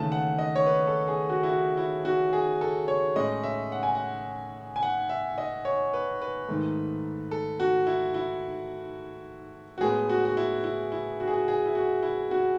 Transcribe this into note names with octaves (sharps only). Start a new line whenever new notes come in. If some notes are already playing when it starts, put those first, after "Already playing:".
Already playing: D#2 C#3 E3 A3 A5
F#5
D#5
C#5
B4
A4
G#4
F#4
E4
F#4
E4
F#4
G#4
A4
C#5
A2 G#3 C#4 D#5
E5
F#5
G#5
F#5
G#5
F#5
E5
D#5
C#5
B4
B4
G#2 D#3 A3
A4
F#4
E4
E4
F#4
A2 G#3 B3 G#4
F#4
F#4
E4
E4
E4
F#4
G#4
F#4
G#4
E4
F#4
E4
F#4